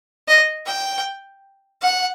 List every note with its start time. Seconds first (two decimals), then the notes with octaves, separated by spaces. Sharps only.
0.28 D#5
0.66 G5
1.81 F#5